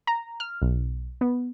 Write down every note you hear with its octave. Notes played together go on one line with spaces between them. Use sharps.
A#5
F6
B1
B3